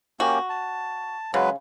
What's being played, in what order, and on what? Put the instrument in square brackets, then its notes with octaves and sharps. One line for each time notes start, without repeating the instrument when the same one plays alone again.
[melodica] A#3 C#4 G4 [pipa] F#4
[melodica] A5
[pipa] C#3 [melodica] F#3 G#3 B4